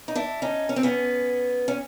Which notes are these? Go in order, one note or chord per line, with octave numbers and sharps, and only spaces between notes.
D#4
D4 E4
C#4 D#4
C#4
C4
B3 C#4
C#4